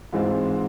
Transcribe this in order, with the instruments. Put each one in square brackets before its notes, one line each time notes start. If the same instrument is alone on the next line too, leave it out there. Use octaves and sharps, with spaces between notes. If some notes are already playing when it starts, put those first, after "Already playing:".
[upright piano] G#2 E3 G#3 C4 F4